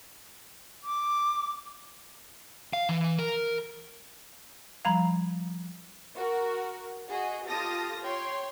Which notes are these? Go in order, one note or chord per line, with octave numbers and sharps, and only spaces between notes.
D6
F5
E3
A#4
F3 G3 F5 A#5 B5 G#6
F#4 A#4
F#4 G#4 D#5
F4 G4 A4 A5 D#6 A#6
C#5 G5 C6